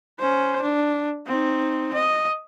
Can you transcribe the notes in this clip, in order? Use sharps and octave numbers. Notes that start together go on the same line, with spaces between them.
C#4 C5
D4
C4 D#4
D#5